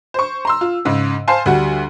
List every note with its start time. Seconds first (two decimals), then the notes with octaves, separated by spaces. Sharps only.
0.14 C5 C#6
0.45 A#5 C6 E6
0.61 F4
0.85 G#2 C#3
1.27 C5 F5 G#5 A5 C6
1.46 D2 G3 F#4 F#5